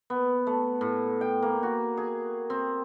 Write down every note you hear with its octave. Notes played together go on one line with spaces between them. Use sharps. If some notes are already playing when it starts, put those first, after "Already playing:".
B3
A3
A2
G5
A#3
F#4
G#4
C4